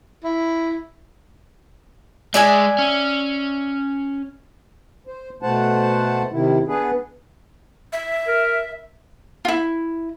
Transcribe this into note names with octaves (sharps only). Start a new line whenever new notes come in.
E4
G#3 D5 E5 G#5
C#4
C5
B2 A3 C5 F#5 A5
C3 D#3 E4
B3 D4 G#4 B4
E5
A#4
E4 F4